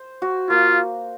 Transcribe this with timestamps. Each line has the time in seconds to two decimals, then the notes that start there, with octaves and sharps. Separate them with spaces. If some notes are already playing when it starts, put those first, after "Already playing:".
Already playing: C5
0.22 F#4
0.49 A#3 F4